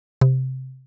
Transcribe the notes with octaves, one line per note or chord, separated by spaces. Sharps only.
C3